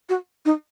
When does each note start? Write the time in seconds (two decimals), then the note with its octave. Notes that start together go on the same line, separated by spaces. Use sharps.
0.09 F#4
0.45 D#4